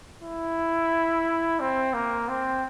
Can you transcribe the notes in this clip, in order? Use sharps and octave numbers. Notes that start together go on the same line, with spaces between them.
E4
C4
A#3
C4